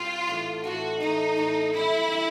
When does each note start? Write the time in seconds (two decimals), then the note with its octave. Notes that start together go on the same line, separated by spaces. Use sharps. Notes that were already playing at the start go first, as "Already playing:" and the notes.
Already playing: A#2 G3 C4 F4
0.27 A2 E3 A3 D4
0.64 A2 E3 A3 D4 F#4
1.00 A2 E3 A3 D4 D#4
1.37 A2 E3 A3 D4
1.73 F2 D3 G3 E4
2.12 D3 G3